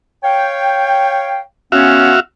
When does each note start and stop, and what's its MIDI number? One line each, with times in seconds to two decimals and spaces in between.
0.23 1.40 73
0.23 1.40 77
0.23 1.40 79
1.72 2.13 59
1.72 2.13 61
1.72 2.20 66
1.72 2.20 76
1.72 2.20 77